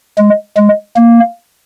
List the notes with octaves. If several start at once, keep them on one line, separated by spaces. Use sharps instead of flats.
G#3
G#3
A#3